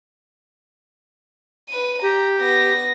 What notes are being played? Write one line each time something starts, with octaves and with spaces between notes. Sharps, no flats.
B4 D#7
G4 A#5
B3 A#6